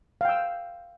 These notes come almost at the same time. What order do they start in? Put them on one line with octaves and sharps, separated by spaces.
F5 G5 E6